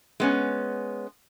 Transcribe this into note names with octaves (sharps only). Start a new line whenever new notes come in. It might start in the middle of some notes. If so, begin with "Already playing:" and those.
G#3 B3 C#4